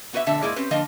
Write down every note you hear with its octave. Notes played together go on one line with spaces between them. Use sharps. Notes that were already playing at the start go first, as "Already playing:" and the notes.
B3 F#4 B4 C5 E5
F2 B2 D3 A3 E5 A5
G#2 A#3 E4 G#4 D5
C4 C#4 G4 B4
D3 F3 A#3 D4 D#5 F5